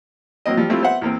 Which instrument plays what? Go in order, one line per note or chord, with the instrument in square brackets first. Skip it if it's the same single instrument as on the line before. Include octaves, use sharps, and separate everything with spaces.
[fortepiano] F#3 A#3 C4 D#5
F3 G3
G3 A3 C4 E4 F4 G4
B3 C5 E5 F#5
E2 A#3 C4